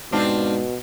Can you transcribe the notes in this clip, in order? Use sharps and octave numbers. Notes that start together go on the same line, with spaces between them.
G#2 B2 C4 D4 F4